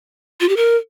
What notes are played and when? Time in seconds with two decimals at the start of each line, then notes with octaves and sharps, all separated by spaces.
0.40 F4
0.49 G4
0.56 A#4